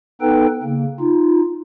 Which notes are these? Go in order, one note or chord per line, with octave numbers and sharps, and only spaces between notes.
B3 D#4 A4 B4 G5
C#3 A#3
D#4 F4